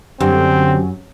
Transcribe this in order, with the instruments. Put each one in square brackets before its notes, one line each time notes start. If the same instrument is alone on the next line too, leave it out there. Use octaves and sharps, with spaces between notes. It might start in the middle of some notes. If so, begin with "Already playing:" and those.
[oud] F#2 [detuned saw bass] D3 [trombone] C4 [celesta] G4